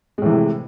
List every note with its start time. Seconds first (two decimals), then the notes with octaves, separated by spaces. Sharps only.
0.18 G#3
0.22 A2
0.25 E3
0.29 C3